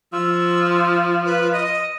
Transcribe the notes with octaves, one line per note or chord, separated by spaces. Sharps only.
F3 E6
B4
D#5